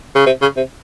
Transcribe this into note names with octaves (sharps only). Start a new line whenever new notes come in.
C#3
C3
C#3
C3